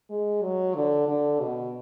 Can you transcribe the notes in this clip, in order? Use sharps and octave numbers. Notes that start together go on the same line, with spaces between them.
G#3
F#3
D3
D3
B2